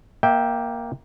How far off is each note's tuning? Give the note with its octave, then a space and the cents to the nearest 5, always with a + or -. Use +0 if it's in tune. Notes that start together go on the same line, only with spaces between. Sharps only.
A#3 +10 E5 -20 G5 +0